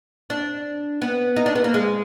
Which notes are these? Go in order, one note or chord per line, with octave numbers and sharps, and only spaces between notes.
D4
B3
D#4
D4
B3
A#3
G#3